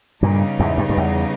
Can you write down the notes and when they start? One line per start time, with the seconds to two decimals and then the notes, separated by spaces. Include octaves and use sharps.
0.22 G2 A#2 C#3 G3 B3 D#4
0.60 E2 G#2
0.78 G2
0.89 G2
0.97 E2